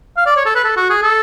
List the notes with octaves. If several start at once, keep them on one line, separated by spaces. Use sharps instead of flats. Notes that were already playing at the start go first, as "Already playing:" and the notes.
F5
D5
C#5
A4
B4
A4
F#4
G#4
A4